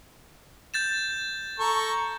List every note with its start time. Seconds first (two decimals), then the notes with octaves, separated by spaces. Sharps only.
0.74 G6 A6 E7
1.59 A4 A#5 C#6